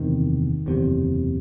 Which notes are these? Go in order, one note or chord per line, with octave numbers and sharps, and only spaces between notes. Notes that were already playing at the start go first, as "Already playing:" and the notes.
Already playing: F#1 E2 C3 D#3
F#1 E2 C3